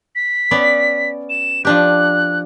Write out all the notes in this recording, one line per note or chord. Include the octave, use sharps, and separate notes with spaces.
B6
B3 C#4 D5
E7
F3 D4 G4 F#6